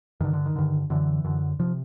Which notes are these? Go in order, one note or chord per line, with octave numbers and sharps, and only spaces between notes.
G2 D3 D#3
D3
D#3
G2 D3
F#2 D3 E3
F#2 D3
C3 F3